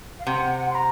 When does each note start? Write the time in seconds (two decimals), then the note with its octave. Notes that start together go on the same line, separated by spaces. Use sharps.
0.19 F5
0.26 C3 F#5
0.71 C6
0.75 A#5